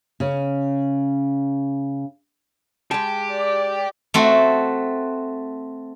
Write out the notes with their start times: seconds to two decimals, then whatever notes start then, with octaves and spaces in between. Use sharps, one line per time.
0.20 C#3 C#4
2.91 G#3 G4 A5
3.32 D5
4.14 A3 C4 F#4